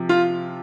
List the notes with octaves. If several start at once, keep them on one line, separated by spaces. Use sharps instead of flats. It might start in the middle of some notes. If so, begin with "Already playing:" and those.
Already playing: C3 F3
F4